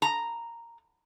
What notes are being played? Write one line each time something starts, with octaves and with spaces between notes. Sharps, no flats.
A#5